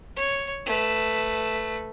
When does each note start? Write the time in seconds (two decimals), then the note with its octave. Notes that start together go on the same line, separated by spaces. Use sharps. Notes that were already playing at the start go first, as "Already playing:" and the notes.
0.16 C#5
0.65 A3 B4